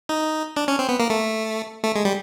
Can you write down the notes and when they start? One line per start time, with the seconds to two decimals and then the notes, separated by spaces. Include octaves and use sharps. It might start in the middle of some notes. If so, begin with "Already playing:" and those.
0.09 D#4
0.56 D4
0.68 C#4
0.79 C4
0.89 B3
1.00 A#3
1.10 A3
1.84 A3
1.95 G#3
2.05 G3